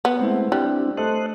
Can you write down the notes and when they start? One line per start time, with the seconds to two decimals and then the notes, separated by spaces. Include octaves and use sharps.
0.05 B3
0.20 G#3 A3 C4 E4
0.52 G3 C4 D4 E4 F#6
0.97 A3 A4 C5 D#5 F#6